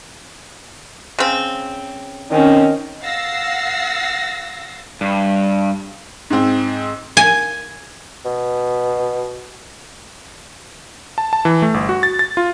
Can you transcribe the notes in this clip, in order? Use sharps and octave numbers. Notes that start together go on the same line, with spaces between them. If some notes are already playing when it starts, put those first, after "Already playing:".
C#3 C4
D#3 C4 C#4
F5 F#5 E6 A6 A#6 C7
G2
G#2 C4
G#5
B2
A5
A5
E3
A3
G1
F#4
A6
A6
F4